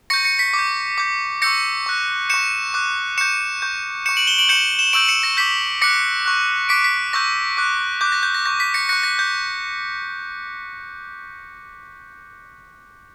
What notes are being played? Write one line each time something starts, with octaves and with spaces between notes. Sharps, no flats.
C#6 G6 A#6 C#7
A#6 C#7
B6
D6
G6
D6 G6
C#6 E6 G6 A#6 C#7
C#6 F#6
C#6 G6 C#7 E7
D6 F#6
C#6 G6 C#7 E7
C#6 G6
C#6 G6 C#7 E7
D7 F#7
E7 G7
D7 F#7
C#6 G6 C#7 E7
E7 G7
C#6 E6 G6 D7 F#7
C#7 E7
A#6
D6 G6 B6
D6 F#6 A#6 C#7
C#6 F#6
D6 F#6 B6 D7
B6
C#6 E6 G6 A#6
D6 F#6
D6 F#6 G6
A#6
G6
A#6
C#6 G6 A#6
B6
A#6 C#7
C#6 F#6 A#6 C#7
A#6
G6